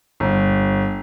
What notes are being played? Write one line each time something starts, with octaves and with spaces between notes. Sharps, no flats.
G1